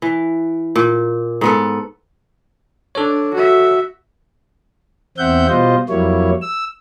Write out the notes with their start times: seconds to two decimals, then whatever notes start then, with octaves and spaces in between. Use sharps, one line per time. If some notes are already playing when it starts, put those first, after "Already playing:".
0.02 E3
0.76 A#2
1.41 G#2 B3 A4
2.95 D4 A4 C#5
3.34 F#4 E5
5.18 E2 C4 E5 F#5 G6
5.49 B2 G3 F4 C5 D#5
5.89 F2 F#3 G3 A#3 E4 C#5
6.42 E6